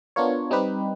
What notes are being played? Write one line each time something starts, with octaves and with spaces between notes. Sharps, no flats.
B3 D4 F4 A#4 C#5
G3 C4 D#4 G4 B4